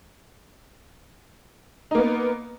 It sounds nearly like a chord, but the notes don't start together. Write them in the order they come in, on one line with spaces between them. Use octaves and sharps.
D#4 A#3 B3